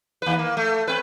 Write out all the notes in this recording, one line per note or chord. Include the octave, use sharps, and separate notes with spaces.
D#2 B4
A#3
A3
C4 B4